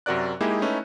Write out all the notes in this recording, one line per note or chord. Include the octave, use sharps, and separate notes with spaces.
F#2 C3 F#4 A#4 D5 F#6
G#3 A#3 D#4 E4 G4 G#4
A3 C#4 D#4 E4 B4